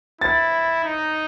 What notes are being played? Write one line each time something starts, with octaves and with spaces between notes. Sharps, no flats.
E4 A6
D#4